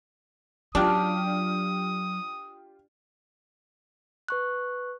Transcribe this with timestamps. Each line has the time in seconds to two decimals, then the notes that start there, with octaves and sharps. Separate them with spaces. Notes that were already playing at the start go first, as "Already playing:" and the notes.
0.75 F#3 D4 F4 G4 D#6 F6
4.28 B4 C#6 F#6